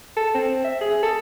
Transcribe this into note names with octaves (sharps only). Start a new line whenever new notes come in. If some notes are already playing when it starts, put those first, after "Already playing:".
A4
C4
E5
G#4
A4